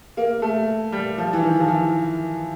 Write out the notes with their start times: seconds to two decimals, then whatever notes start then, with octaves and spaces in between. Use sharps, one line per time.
0.17 A#3
0.42 A3
0.92 G3
1.18 F3
1.33 E3
1.42 D#3
1.60 F3
1.68 E3